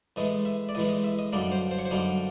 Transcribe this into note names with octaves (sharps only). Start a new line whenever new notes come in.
A2 E3 G#3 D#5
E5
D5
A2 E3 G#3 D#5
D#5
E5
D#5
F#2 D3 G3 A#3 D#4 D5
C5
C5
C#5
C5
F#2 D3 G3 A#3 D#4